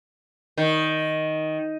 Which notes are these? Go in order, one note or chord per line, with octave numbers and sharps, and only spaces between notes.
D#3